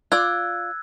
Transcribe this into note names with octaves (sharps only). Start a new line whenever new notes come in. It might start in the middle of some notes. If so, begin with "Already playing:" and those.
F4 D5 E6 F#6 G#6